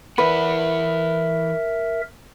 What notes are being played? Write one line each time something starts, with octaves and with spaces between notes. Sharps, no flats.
E3 E4 A#4 B4 E5 F#5